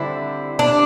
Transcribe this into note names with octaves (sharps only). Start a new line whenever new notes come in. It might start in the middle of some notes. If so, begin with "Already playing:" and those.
Already playing: D3 G3 C4 E4
D4